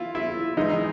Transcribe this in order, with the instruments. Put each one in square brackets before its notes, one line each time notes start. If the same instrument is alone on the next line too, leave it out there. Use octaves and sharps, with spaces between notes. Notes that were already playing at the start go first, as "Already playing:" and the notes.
Already playing: [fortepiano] E4 F4
E4
[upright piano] G#2 E3 G#3 [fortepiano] D#4